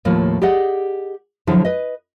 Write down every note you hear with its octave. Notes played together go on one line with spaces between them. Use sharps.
D#2 A2 F3 A#3
G4 G#4 D5 D#5 F#5
D3 F3 F#3 E4 G#4
B4 D#5